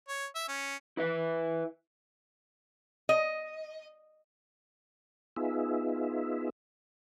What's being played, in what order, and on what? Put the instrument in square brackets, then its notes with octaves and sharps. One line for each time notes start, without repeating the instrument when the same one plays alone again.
[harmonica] C#5
E5
C#4
[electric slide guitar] E4 B4 E5
[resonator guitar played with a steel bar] D#5
[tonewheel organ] B3 D#4 F4 G#4 E5